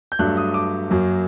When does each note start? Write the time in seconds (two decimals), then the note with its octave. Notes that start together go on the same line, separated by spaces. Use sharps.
0.12 G6
0.19 G2 F#3 A3 D4 F#6
0.37 D#6
0.54 D6
0.90 F#2 F#3 A#3